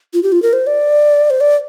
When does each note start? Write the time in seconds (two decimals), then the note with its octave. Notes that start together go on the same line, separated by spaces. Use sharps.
0.14 F4
0.23 G4
0.32 F4
0.42 A#4
0.53 C5
0.67 D5
1.30 C5
1.41 D5